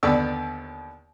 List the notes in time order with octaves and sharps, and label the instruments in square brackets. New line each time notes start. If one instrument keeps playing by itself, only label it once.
[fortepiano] D#2 D3 B3 D5 C#6 E6